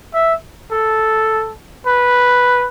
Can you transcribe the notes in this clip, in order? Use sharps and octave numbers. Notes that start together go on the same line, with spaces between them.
E5
A4
B4